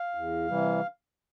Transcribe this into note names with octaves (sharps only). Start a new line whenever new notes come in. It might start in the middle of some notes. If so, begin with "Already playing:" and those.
Already playing: F5
E2
C3 E3 G3